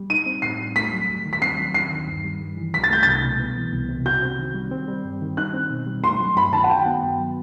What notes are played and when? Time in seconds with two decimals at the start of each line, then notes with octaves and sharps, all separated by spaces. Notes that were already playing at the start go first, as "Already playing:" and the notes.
Already playing: G3
0.10 D#4 D#7
0.26 C4
0.42 A2 C7
0.59 G3
0.76 A3 B6
0.93 F#3
1.09 D#2
1.26 D#3
1.33 B6
1.41 C4 C7
1.58 F#3
1.74 D#2 C7
1.91 D#3
2.07 G2
2.25 G3
2.41 G2
2.57 E3
2.74 C2 B6
2.84 A6
2.90 A3 G6
3.03 C2 A6
3.23 B2
3.40 B3
3.56 E3
3.73 C2
3.89 C3
4.06 F#4 G6
4.22 C4
4.39 D#3
4.55 G3
4.71 C4
4.88 G3
5.04 G2
5.21 D#3
5.37 D#4 F#6
5.53 C4
5.70 B2
5.86 G3
6.04 A3 C6
6.20 F#3
6.36 G2 B5
6.53 D#3 A5
6.63 F#5
6.69 F#4 G5
6.86 B3
7.03 G2
7.19 F#3